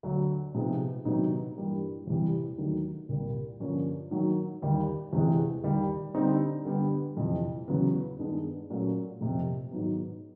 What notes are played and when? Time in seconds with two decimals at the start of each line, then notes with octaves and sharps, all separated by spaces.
0.03 D2 D3 F#3
0.54 C3 F3 G#3 B3 D#4
1.05 C3 D#3 F#3 B3 D#4
1.56 G2 E3 G3 A#3
2.07 E2 C3 E3 G3
2.58 D#2 D#3 F#3 A3
3.09 C2 A#2 G3 A#3
3.60 G2 D3 F3 A#3 C#4
4.11 D#3 F#3 A#3
4.62 D#2 D#3 G3
5.13 E2 C3 E3 G#3
5.64 D#2 D#3 G3
6.15 D3 G3 C4 D#4
6.65 D3 G3 B3
7.17 F2 C3 E3
7.68 E2 C#3 F#3 B3
8.19 G2 D#3 G#3 B3 D4
8.70 A#2 F#3 A3 C#4
9.21 F2 C3 F3 A#3
9.71 G#2 D#3 F#3 B3